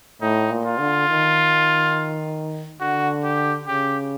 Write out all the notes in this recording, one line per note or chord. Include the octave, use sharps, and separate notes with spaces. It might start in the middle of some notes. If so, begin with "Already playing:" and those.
A2 D#4
A#2
F4
D3
D#3
D3 F#4
G4
C#3 G4